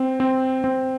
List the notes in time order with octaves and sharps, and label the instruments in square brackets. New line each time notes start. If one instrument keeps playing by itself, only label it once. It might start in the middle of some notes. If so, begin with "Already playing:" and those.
Already playing: [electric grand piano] C4
C4
C4